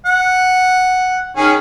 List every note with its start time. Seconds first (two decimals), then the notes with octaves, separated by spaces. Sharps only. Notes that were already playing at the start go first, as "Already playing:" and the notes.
0.06 F#5
1.37 D#3 C#4 G#4